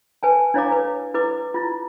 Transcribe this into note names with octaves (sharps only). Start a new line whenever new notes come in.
B4 G#5 A5
D4 E4 C#5 F5 A#5 D6
B4
E4 B4 D6
E4 F4